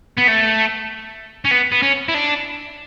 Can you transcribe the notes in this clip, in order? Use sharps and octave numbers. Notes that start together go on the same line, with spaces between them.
B3
A3
C#4
B3
B3
C#4
E4
D4